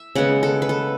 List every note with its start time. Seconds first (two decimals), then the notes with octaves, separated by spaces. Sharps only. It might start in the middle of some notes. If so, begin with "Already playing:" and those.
Already playing: E5
0.15 C#3 G#3 B3 F#5
0.43 A4
0.62 B4
0.69 A4